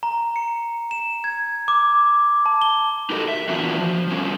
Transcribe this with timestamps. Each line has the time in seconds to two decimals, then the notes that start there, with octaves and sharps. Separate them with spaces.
0.03 A#5
0.36 C#7
0.91 E7
1.24 G#6
1.68 D6
2.46 A5
2.62 G7
3.10 D#4 F#4 G4 A4 A#4 D#5
3.28 E5
3.49 E3 F#3 B3 D4 F4 F#4
3.80 F3
4.08 F3 G3 C#4